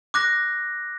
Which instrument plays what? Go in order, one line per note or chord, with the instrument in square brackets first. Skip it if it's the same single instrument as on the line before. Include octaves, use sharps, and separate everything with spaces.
[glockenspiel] D6 F#6 A#6